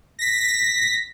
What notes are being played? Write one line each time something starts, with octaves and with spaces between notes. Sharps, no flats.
A#6 B6